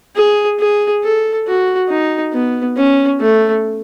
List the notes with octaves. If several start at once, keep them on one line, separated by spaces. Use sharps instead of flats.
G#4
G#4
A4
F#4
D#4
B3
C#4
A3